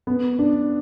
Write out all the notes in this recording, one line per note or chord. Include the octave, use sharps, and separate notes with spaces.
B3
D4